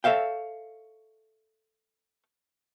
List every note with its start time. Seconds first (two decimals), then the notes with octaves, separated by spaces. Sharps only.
0.04 A4 C#5 E5 F5 G5